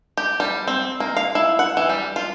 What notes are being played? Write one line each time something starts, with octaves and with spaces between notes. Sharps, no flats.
G4
G3
C4
A#3
F5
E4
F#5
E3
G3
F4